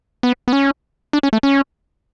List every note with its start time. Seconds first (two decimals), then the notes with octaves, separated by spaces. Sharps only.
0.23 B3
0.48 B3
0.53 C#4
1.13 D4
1.23 C#4
1.33 A3
1.43 C#4